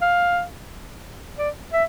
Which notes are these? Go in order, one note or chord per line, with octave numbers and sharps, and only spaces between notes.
F5
D5
E5